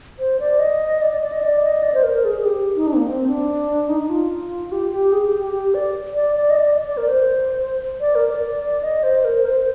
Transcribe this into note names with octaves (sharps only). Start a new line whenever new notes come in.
C5
D5
D#5
D5
D5
D5
D#5
D5
D#5
D5
C5
A#4
A#4
G#4
G#4
G4
D#4
D4
C4
A#3
C4
D4
D#4
F4
G4
G4
G#4
G4
G4
G4
D5
D5
D5
D#5
D5
D5
D5
A#4
C5
D5
A#4
D5
D#5
C5
A#4
C5